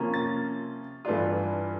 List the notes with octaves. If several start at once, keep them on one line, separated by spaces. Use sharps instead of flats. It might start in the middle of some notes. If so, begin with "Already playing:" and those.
Already playing: C3 F3 A#3 C#4 F4
A6
G2 E3 A3 D4 F4